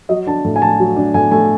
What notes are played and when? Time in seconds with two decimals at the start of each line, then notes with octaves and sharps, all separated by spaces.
0.09 F#3 D#5
0.27 D4 A5
0.45 A2
0.56 G#5
0.62 A3 A5
0.80 F#3
0.97 D4
1.14 A2 G#5
1.31 A3 G#5